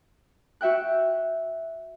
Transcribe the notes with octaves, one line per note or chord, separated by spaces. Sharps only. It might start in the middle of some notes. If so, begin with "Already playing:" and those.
F#4 E5 G5 F#6